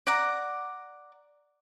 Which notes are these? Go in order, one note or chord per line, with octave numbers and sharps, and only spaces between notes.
D5 F#5 A#5